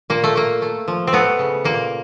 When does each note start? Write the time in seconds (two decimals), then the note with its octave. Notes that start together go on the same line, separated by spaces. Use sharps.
0.10 A#2 A#3
0.24 A3
0.35 A3 A#3
0.62 A3
0.88 F3
1.07 C4
1.13 A3 B3
1.39 C#3
1.64 A#2 A#3